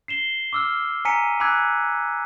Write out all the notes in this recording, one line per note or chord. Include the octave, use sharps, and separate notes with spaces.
C7 E7 G7
D6 E6 F6
G#5 A#5 B6 C#7 D#7
G#5 B5 D6 E6 F#6 G#6